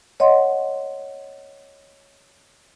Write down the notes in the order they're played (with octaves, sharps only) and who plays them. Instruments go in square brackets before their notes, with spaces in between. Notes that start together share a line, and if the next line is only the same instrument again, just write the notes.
[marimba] C#5 D#5 F#5 C6